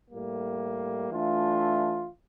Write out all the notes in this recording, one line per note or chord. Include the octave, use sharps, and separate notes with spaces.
A2 G3 A#3
E3 A3 D4 F4